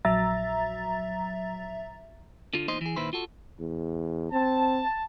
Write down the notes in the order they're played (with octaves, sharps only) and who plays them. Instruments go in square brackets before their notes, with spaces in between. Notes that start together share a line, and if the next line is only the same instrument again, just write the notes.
[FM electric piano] A#1 F#3 E5 A#5 A6
[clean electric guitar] D3 F4
E2 A#2 D#4 C5 D#5 C6
E3 G#4
A#2 D#3 E4 B4 C5
F4 F#4 A4
[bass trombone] E2
[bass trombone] C4 [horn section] A5